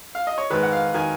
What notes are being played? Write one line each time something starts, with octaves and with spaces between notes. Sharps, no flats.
F5
D#5
C#5
G#2 D#3 B4
F#5
F5
D#3 G#5